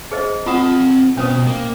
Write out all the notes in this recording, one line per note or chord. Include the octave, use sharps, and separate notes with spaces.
G#4 C5 D#5
C4 F4 F#5 A5 D#6
B2 B3 C#4 C5 D#6
A#3